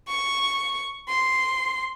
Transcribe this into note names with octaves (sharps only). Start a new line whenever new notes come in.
C#6
C6